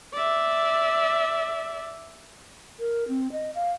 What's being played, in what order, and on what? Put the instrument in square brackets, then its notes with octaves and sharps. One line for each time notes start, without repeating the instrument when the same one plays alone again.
[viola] D5 E5
[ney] A#4
C4
D#5
F5